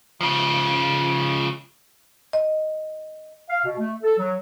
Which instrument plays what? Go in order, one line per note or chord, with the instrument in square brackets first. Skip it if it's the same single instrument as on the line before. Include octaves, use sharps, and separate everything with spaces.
[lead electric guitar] C#3 F3
[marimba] D#5
[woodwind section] F5
B2
A3
A4
F#3